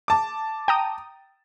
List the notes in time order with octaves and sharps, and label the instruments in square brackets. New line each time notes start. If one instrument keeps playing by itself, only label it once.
[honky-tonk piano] A5 D6
[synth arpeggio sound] G5 A#5 D#6